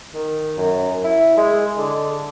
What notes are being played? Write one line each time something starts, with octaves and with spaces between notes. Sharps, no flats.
D#3
F#2
E4
G#3
D3